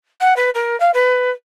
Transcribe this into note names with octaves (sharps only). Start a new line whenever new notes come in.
F#5
B4
A#4
F5
B4